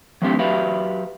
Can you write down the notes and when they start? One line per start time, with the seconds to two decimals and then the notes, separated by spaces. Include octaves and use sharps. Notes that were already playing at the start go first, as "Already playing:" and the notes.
0.22 F#3 G3 A3 C4 D4 G4
0.39 F#3 F#4 G4 B4 E5 F5